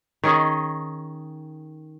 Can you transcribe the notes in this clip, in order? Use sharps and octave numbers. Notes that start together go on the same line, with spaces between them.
D#3 C#4 G#4 D#5